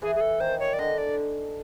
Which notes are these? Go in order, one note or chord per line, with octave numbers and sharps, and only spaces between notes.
E3 G#4
G#4
A4
D#3 C5
C#5
D5
D3 D#5
D5